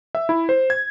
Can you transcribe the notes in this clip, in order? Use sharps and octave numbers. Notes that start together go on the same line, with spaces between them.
E5
E4
C5
G#6